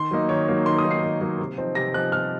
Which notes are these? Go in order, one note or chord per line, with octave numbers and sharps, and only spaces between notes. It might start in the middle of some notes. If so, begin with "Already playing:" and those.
Already playing: D#3 C6
F#3 A#3 D#4
D#3 C#5
F#3 A#3 D#4
D#3 C6
D#6
F#3 A#3 D#4
C7
D#3
F#3 A#3 D#4
C3
F3 C4 D#4
C3 A#6
F3 C4 D#4 F#6
C3 F6